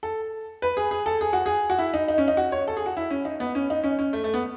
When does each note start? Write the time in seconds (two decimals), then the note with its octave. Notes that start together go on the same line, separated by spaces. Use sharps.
0.03 A4
0.62 B4
0.77 G#4
0.91 G#4
1.06 A4
1.21 G#4
1.33 F#4
1.46 G#4
1.70 F#4
1.78 E4
1.94 D#4
2.08 D#4
2.18 C#4
2.28 D#4
2.37 F#4
2.52 C#5
2.68 A4
2.77 G#4
2.86 F#4
2.97 E4
3.11 C#4
3.25 D#4
3.40 B3
3.55 C#4
3.70 D#4
3.84 C#4
3.99 C#4
4.13 A3
4.24 A3
4.34 B3